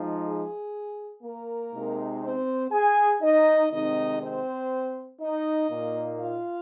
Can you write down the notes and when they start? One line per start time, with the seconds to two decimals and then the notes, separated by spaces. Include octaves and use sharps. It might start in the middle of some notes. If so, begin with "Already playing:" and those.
Already playing: F3 G#3 D#4
0.24 G#4
1.23 A#3 A#4
1.73 C3 G#3 D#4
2.22 C4 C5
2.72 G#4 G#5
3.22 D#4 D#5
3.71 C3 D#3 G#3 C4 D#4 D#5
4.21 C4 C5
5.20 D#4 D#5
5.69 A#2 A#3 D#4
6.19 F4 F5